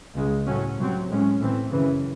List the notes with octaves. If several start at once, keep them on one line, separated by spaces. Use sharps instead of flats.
C#2 C#3 G#3
A2 F#3 C#4
C3 F#3 C4
A2 G#3 C#4
A2 E3 C4
F#2 C#3 E3